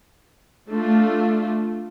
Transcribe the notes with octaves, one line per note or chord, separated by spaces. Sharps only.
A3 D4 F4